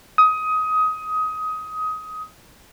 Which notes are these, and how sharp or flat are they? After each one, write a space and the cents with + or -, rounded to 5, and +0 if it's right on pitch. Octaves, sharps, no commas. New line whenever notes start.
D#6 +20